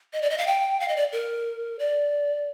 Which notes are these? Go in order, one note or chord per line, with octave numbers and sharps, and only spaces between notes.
D#5
D5
D#5
F5
G5
F5
D#5
D5
A#4
D5